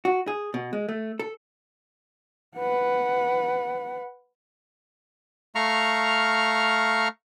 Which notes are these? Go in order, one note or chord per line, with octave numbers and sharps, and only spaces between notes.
F#4
G#4
B2
G#3
A3
A4
B4 F#5
A3 F5 A#5 C#6 F6